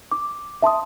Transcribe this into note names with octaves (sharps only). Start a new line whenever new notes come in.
D6
E5 A5 C6 D#6